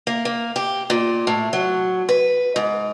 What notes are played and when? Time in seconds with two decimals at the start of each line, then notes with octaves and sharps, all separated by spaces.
0.07 A#3
0.25 A#3
0.56 G4
0.90 A#2
1.27 A2
1.53 F#3
2.09 B4
2.56 G#2